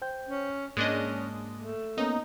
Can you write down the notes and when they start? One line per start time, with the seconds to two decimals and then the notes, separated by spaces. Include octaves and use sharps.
0.02 C5 G5 G6
0.28 C#4
0.77 G#2 G#3 A#3 C#4 D4 D#5 F#6
1.57 A3
1.98 A#3 B3 C#4 D#4